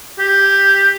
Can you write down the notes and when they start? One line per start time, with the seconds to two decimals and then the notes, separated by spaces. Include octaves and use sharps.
0.19 G4